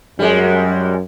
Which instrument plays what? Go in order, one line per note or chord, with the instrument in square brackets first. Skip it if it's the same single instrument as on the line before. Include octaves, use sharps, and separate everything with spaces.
[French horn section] F#2 [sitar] G3 G#3